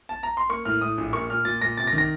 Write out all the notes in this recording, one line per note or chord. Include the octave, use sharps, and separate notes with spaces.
A5
A#5
C6
A#3 C#6
A2 F6
A2 D#6
A#1
A#3 C#6
A#2 F6
A#2 A6
A#2 A#6
C3 A6
A#6
D#3
A#6